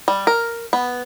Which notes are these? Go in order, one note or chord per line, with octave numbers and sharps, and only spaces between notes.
G3
A#4
B3